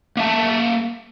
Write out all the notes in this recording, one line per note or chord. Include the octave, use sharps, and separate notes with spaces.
A#3 E5 A5